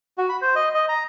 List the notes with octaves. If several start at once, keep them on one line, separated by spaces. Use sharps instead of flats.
F#4
B5
C5
D#5
D#5
A#5